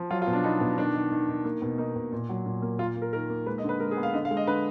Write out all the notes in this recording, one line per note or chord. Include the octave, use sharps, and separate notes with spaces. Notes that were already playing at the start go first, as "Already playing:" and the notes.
Already playing: F3
F#3 F4
F4
B2
D4
B3 D#4
B2
D#3 D4
D#3
D#3
D#3
A#3
B2
A#3 D#4
B2
A#2
F#3
A#2
A#3
A#3 F4
A#3
A#4
D#3 A#4
A#3
G#3 B4
D#5
D3
B4
G#3 A#4
G#4
B3
F5
D3 D#5
F5
G#3
D#5
D3 B4